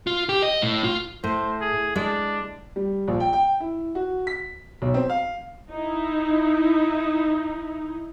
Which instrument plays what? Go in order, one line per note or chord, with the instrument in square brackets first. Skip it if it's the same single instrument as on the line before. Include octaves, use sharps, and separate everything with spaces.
[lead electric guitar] F4
G4
D#5
A2
F4
[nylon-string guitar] A2 [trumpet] C5
[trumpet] G#4
[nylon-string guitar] G#3 [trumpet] D4
[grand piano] G3
A#1
G5
G5
E4
F#4
B6
B1
C4
F5
[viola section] D#4 E4